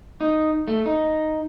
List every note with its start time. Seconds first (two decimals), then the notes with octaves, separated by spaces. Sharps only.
0.21 D#4
0.68 A3
0.86 D#4